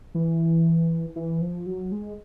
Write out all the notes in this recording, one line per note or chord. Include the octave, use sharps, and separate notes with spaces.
E3
E3
F3
F#3
G#3